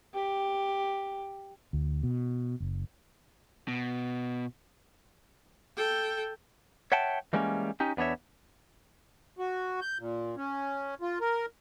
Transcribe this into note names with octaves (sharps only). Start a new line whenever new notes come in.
G4
D2
B2
F#1
B2
A4 G5
C#5 E5 F#5 G5 A5
E3 G3 G#3 A#3 C4 C#4
C#4 D#4 G4
E2 B3 D4 C#5 E5
F#4
G6
A#2
C#4
F4
A#4